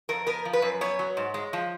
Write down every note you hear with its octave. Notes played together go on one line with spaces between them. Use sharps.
F2 A#4
B3 A#4
F3
B4
F#2
B3 C#5
F#3
G#2
G#3
F3